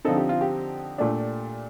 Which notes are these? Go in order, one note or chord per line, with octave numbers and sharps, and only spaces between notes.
D3 F3 C4 D#4 A4
G4
F4
G4
A#2 A3 D4